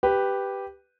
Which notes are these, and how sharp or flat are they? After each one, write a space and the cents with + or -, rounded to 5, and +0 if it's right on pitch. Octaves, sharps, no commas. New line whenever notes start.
G4 +0 B4 +0